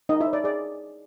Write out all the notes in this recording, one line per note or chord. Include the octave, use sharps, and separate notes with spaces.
D#4 A#4 D#5
E4 E5
C#5
D5
G#4 D5